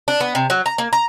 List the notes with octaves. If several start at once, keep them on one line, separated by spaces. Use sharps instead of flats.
D4
B3
C3
F#3
A#5
A#3
A#5